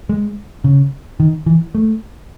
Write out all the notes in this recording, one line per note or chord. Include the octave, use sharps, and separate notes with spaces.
G#3
C#3
D#3
E3
A3